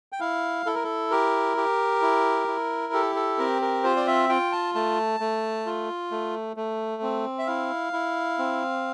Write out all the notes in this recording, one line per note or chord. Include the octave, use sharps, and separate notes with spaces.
G5
E4 F5
E4 A4
A#4
A4
G4 A#4
G4
E4
E4
G4 A4
A4
C4 A#4
A#4
F4 C5
D5
E5
F4 G5
A5
A3 A5
A3
F4
A3
A3
C4
E5
E4 F5
E4
C4